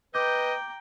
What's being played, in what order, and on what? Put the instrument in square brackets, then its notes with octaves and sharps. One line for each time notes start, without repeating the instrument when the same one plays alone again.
[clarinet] B4 [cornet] D#5 [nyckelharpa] G5 A#5 [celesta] D6 G6